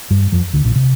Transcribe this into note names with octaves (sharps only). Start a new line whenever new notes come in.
G2 G3
F2 F3
D2 D3
A#1 A#2
C3